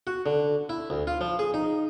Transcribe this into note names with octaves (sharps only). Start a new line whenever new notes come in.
F#4
D3
E4
D2
F4
F3
G#4
D#4